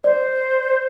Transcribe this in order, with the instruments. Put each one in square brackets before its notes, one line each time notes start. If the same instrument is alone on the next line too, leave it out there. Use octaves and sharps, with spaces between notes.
[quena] C5 [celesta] D5